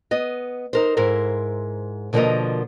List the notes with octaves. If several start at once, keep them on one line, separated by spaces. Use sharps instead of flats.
B3 D#5
D#4 A#4 C5
G#2 E4 A#4 C5
B2 D3 F3 A#3 A#4 D#5